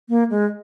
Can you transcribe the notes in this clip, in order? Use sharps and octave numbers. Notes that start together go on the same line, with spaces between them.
A#3
G#3